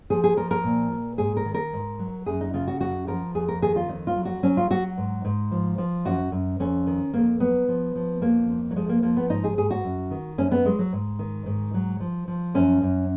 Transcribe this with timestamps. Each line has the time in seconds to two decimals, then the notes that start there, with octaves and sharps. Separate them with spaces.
0.10 F3 G#4
0.24 G#4
0.37 F3 A#4
0.51 A#4
0.64 A#2
0.92 A#2
1.18 G#2 G#4
1.37 A#4
1.45 D#3
1.54 A#4
1.73 G#2
1.99 F#3
2.26 F#2 G#4
2.41 D#4
2.54 C#3 F4
2.67 F#4
2.81 F#2 F#4
3.07 F3 A#4
3.35 F2 G#4
3.48 A#4
3.62 D#3 G#4
3.76 F4
3.89 F2 D#4
4.07 F4
4.16 F#3
4.25 F#4
4.43 F#3 C#4
4.57 F4
4.70 F#3 F#4
4.97 G#2
5.25 G#2
5.51 F3
5.78 F3
6.05 F#2 F#4
6.32 F#2
6.60 F2 C#4
6.86 D#3
7.13 F2 A#3
7.40 F#3 B3
7.68 F3
7.95 F3
8.22 F2 A#3
8.49 F2
8.71 F#3
8.76 F3 G#3
8.89 A#3
9.02 F3 A#3
9.17 B3
9.30 G#2 D#4
9.44 G#4
9.57 G#2 G#4
9.71 F#4
9.84 F#2
10.11 D#3
10.38 F#2 C#4
10.51 B3
10.65 F#3 G#3
10.79 F#3
10.93 G#2
11.19 D#3
11.46 G#2
11.74 F#3
12.00 F3
12.28 F3
12.54 F#2 C#4
12.82 F#2